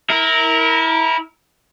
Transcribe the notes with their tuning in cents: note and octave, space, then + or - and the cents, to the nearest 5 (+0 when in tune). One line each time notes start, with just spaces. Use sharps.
E4 -25 A#4 +0